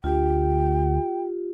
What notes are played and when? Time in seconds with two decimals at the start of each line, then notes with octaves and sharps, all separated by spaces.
0.04 D2 F4 G4 G5